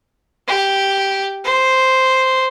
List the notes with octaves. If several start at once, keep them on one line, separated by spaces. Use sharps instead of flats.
G4
C5